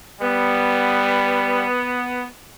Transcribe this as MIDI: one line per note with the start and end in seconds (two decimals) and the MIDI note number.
0.21 1.66 55
0.21 2.25 59